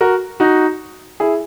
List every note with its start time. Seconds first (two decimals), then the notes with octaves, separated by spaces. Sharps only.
0.01 F#4 A#4
0.40 D#4 F#4
1.20 E4 G#4